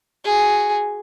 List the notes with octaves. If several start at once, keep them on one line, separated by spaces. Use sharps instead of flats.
F#4 G#4